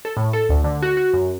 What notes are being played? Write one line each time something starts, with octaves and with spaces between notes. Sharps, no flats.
A4
A2
A4
D2
D3
F#4
F#4
F#2